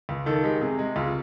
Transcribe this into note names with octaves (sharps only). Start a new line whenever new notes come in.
C#2
D#3 A4
G#3 G4
C3 G#4
G#3
C#2 F4